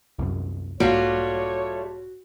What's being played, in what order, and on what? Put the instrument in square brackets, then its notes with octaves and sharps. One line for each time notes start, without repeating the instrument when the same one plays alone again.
[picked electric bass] C2 F#2
[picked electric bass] B1 G#2 A#3 [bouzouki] G3 A3 F4 [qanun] F#4 [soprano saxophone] C#5